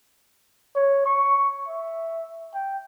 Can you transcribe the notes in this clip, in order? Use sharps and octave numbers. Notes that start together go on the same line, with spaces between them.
C#5
C#6
E5
G5